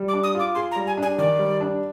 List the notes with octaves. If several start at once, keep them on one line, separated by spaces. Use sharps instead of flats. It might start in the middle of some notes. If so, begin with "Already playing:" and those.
Already playing: G3
D6
D4
D#6
F4 D6
G#4 C6
A#5
G3
G#5
D4 G#5
D#3 D5
G3
D4